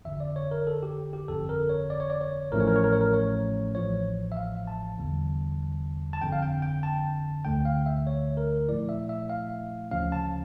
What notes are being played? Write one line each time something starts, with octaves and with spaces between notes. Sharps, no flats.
G1 F2 D3 E5
D5
C#5
A#4
A4
G4
G4
G1 F2 D3 A4
A#4
C#5
D5
C#5
D5
C#5
A1 A2 F3 A3 C#4 A#4
C#5
A#4
C#5
A#4
C#5
A#4
C#5
A1 A2 F3 C#5
E5
F5
A5
E2 D3 G3
A5
G1 F2 D3 G5
F5
G5
G5
A5
D2 D3 A3 G5
F5
E5
C#5
A#4
A#2 F3 A3 E4 D5
E5
E5
F5
D2 C#3 F3 C#4 F5
A5